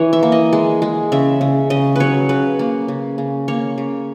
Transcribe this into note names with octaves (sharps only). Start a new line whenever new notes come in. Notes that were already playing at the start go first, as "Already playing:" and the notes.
Already playing: E3 B4 C#5
E5
A#3
D#5
G#3
G#3
C#3 E5
C#3
C#3 D#5
F#3 B4 C#5
C#3 B4
A#3
C#3
C#3
A#3 C#5
C#3